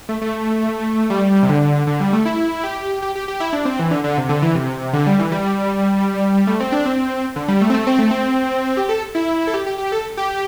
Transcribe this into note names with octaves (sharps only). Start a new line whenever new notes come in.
A3
A3
G3
C3
D3
D3
G3
A3
E4
G4
G4
G4
G4
E4
D4
C4
E3
D3
D3
C3
D3
E3
C3
D3
G3
E3
G3
A3
C4
D4
C4
D3
G3
A3
C4
A3
C4
A3
C4
G4
A4
E4
A4
G4
G4
G4
A4
G4